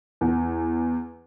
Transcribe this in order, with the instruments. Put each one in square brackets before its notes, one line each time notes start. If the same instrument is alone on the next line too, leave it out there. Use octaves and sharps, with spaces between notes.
[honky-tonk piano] E2